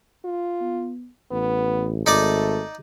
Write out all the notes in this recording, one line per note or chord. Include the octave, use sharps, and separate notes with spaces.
F4
B3
A1 B3
G#1 A3 D#4 D5 D6